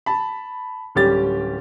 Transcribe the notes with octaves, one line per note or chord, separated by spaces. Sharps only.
A5 B5
D1 G3 C#4 G4 A6